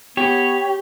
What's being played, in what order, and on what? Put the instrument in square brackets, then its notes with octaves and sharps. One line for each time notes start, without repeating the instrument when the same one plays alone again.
[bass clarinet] B3 [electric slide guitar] G4 [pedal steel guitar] C#5